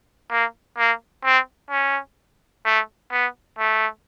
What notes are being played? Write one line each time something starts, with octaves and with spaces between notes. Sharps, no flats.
A#3
A#3
C4
C#4
A3
B3
A3